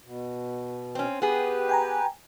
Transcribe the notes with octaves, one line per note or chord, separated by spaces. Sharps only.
B2
C4 C#4
B3 G4 G#4 B4
G5 G#5 A#5